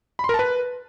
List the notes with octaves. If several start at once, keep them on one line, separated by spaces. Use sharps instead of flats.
B5
C6
A#4
A5
B4